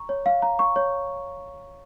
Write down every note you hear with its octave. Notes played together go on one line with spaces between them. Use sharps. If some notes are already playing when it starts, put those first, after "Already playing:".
Already playing: A#5 C#6
C#5
F5
A#5
C#6
C#5